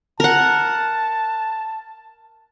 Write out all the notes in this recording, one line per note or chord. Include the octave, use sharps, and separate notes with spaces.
A#4 F#5 A5